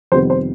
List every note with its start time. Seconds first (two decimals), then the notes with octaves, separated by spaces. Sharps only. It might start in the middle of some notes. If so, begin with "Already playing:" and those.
0.12 F2 C3 D#3 G3 B3 C5
0.30 C5